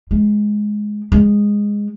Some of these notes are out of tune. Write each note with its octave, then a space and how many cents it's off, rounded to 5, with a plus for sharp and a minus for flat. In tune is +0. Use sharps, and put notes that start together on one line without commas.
G#3 +10
G#3 -10